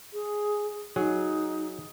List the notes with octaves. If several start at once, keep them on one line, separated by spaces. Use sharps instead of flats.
G#4
F#3 D#4 G#4